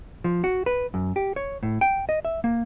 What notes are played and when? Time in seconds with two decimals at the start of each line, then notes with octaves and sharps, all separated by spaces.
0.24 F3
0.44 F#4
0.66 B4
0.94 F#2
1.16 G4
1.36 C#5
1.63 A2
1.81 G5
2.09 D#5
2.25 E5
2.44 A#3